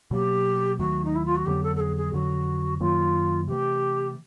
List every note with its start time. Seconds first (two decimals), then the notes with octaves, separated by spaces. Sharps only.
0.11 B2 F#3 A#3 G4
0.79 D#2 D#3 F#3 A3 F#4
1.05 D#4
1.15 E4
1.25 F4
1.36 F#4
1.46 F2 D3 F#3 B3 G4
1.63 A4
1.76 A4
1.80 G#4
1.96 G#4
2.13 F2 D3 F#3 F#4
2.80 F#2 D#3 F#3 A#3 F4
3.48 C3 E3 A3 G4